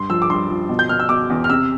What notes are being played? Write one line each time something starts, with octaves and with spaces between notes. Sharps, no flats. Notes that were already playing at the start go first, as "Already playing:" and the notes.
Already playing: G2 C6
F3 E6
D6
G2 C6
F3
B2
G6
B2 F6
E6
B2 D6
E2
F6
C3 E6